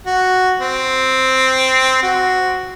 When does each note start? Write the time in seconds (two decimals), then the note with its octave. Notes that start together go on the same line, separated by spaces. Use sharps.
0.06 F#4
0.60 C4
2.03 F#4